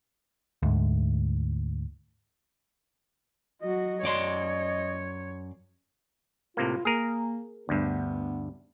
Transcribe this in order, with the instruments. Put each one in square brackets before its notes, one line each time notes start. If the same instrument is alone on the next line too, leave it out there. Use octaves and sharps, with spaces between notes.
[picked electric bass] D2 G#2
[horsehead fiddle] F#3 F#4 [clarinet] D#5
[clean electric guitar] F#2 D5 C6 [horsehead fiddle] C#5
[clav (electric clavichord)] A2 C3 A#3 [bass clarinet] F4
[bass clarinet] A#3 [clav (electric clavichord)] G#4 A#4
[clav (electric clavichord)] D2 G2 [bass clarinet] B3